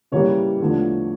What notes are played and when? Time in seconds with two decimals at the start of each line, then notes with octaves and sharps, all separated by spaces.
0.12 C#3 E3 G3 A#3 C#5
0.61 E2 D3 F3 A3